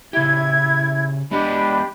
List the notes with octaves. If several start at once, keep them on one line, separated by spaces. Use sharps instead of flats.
C#3 E4 G4 G#6
G#3 B3 D4 G4 D#5 B5